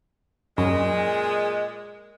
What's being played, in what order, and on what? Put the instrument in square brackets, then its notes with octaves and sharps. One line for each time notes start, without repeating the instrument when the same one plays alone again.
[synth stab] F#2 [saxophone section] A#2 G#3